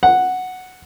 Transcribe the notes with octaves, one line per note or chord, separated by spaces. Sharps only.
F#5